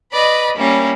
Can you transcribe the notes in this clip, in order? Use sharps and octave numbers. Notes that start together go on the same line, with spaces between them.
B4 D5 D#5 B5
G3 A#3 C#4 E4